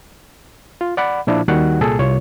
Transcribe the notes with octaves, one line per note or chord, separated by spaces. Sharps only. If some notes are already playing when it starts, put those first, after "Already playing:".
F4
D5 F#5 B5
A#2 F3 D4 E4
D#2 D#3 G3 F#4 F#5 F#6
C2 A#2 G#4 A4
C2 F4 C#5